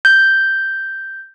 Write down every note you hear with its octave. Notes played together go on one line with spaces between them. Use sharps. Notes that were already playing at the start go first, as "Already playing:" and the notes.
G6